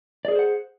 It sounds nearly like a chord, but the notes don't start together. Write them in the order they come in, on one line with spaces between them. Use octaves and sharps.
D5 G#4 A#4 C5 F#5